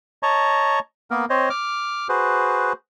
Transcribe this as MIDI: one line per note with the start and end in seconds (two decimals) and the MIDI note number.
0.23 0.79 73
0.23 0.79 75
0.23 0.79 81
0.23 0.79 82
0.23 0.79 85
1.11 1.25 58
1.11 1.25 59
1.11 1.25 70
1.30 1.49 60
1.30 1.49 72
1.30 1.49 73
1.30 1.49 75
1.50 2.08 86
1.50 2.08 89
2.09 2.73 66
2.09 2.73 68
2.09 2.73 71
2.09 2.73 72